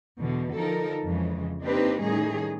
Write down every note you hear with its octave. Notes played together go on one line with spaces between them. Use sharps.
E2 B2 D3 E3
D3 F3 D#4 A4 A#4
F2 C#3 E3 G#3
A#3 C4 D4 D#4 G4 B4
A2 D#3 G3 C#4 D#4 G#4